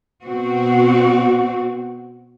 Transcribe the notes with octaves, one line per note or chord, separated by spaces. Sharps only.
B2 C4 F#4